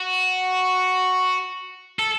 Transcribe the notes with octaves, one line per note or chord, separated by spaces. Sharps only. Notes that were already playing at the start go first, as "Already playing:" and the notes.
Already playing: F#4
A4